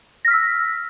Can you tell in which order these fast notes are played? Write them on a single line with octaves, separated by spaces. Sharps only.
A#6 F6 B6 E6